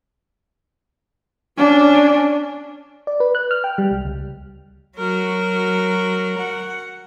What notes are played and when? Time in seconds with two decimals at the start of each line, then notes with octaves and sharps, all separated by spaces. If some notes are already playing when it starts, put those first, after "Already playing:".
1.58 C#4 D4
3.07 D5
3.20 B4
3.35 F#6
3.51 F6
3.64 G5
3.78 G3
3.91 C2
4.05 C#2
4.98 F#3 F#4 A#4
6.38 F#5